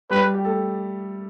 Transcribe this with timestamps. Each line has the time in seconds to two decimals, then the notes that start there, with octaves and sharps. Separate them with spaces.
0.10 G3 G4 B4
0.34 G4
0.45 A3 A4